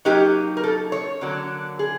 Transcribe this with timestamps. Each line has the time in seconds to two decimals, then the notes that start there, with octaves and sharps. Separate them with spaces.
0.05 F#3 A#3 D#4 G4
0.57 A#4
0.64 A4
0.92 C#5
1.21 D3 F#3 A#3 D4
1.79 G#4